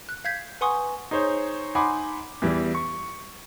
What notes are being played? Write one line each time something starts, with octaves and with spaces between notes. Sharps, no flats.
F#6
F5 G6 G#6 B6
B4 F#5 G#5 C6 C#6 D#6
D#4 G#4 C5 C#5
D#4 F#5 G#5 B5 C6 D6
E2 E3 G3
C#6